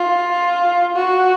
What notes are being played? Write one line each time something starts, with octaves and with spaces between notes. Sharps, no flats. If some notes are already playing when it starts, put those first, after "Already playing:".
Already playing: F4
F#4